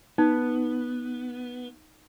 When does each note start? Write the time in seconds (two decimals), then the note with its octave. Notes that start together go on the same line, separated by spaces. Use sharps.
0.18 B3 D#4